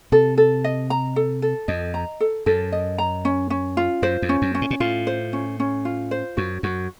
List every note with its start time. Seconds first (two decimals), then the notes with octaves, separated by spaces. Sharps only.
0.12 C3 A4
0.37 A4
0.64 D#5
0.90 A#5
1.16 A4
1.42 A4
1.68 F2 D#5
1.94 A#5
2.20 A4
2.46 F#2 A4
2.72 D#5
2.98 A#5
3.25 C#4
3.50 C#4
3.77 F4
4.02 F#2 C5
4.22 F2
4.29 C#4
4.42 F#2
4.55 C#4
4.62 A2
4.71 A#2
4.80 A2 F4
5.07 C5
5.33 C#4
5.60 C#4
5.85 F4
6.11 C5
6.37 F#2 F#4
6.63 F#2 F#4